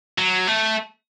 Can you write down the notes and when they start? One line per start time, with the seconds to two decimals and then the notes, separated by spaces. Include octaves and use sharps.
0.18 F#3
0.47 A3